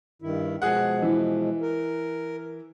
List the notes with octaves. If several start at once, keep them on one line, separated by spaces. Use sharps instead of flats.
G2 D#3 E4
B2 F3 G#3 G#4 F#5
E3
A#4